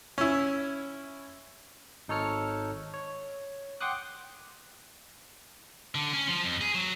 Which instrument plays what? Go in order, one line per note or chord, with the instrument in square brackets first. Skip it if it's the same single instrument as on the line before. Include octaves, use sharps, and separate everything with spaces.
[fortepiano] C#4 E4
[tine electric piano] G#1 D#4 A4 C#5 F6 C#7
C#5
F#5 G5 C6 D6 D#6 F#6
[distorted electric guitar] D3
C#4
F3
F2
G#4
F#3